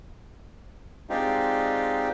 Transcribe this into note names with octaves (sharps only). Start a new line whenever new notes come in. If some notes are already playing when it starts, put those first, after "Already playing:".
G#3 C4 D4 D#4 F4 G4